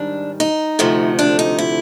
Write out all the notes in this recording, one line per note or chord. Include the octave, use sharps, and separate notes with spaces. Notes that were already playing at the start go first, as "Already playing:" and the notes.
Already playing: G#2 D#3 G3 D4
D#4
D2 C3 F3 A3
D4
D#4
E4